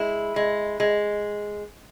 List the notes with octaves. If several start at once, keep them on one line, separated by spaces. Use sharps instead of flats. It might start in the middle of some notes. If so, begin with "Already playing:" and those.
Already playing: G#3 E4
G#3
G#3